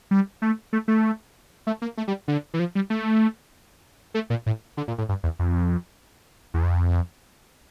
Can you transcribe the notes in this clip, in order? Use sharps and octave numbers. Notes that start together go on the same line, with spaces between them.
G3
A3
A3
A3
A3
A#3
A3
G3
D3
E3
F3
G3
A3
A3
A#2
A2
D3
A#2
A2
G2
E2
F2
E2
F2